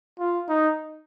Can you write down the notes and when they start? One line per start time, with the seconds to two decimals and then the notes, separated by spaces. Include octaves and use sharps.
0.19 F4
0.49 D#4